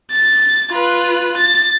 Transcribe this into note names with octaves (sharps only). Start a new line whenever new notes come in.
A6
F4 B4
A6